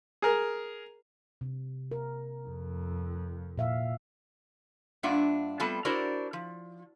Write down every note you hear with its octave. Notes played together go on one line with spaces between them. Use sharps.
G#4 A#4
C3
A#4
F2
A#2 E5 F5
G2 A#3 D4 F4 E5 F#5
G3 A3 B3 C4 F4 A5
D4 E4 F#4 A#4 C5 D5
F3